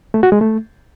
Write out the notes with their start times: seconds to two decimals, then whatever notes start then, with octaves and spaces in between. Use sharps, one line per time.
0.14 A3
0.23 F#4
0.32 G#3
0.41 A3